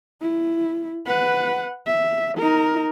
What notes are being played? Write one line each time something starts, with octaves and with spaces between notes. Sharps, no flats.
E4
B4 F#5
E5
D#4 A#4